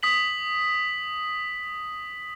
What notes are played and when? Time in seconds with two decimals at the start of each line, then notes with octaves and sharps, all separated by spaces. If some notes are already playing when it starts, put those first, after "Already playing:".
0.03 D#6 B6 F#7